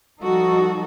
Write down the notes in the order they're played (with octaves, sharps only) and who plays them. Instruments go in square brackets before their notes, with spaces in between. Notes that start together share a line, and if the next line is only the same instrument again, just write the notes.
[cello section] F3 G3 D#4 F#4 A4